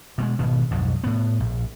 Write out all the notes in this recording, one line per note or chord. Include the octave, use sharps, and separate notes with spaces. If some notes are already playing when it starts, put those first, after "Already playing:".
B2 G3 G#3
G#1 B2 B3
B1 F2 G#2
A2 B3
A#1